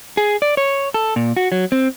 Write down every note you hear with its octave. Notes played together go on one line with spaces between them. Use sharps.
G#4
D5
C#5
A4
A#2
F#4
F#3
C4